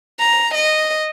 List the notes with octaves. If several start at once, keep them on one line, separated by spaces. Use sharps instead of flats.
A#5
D#5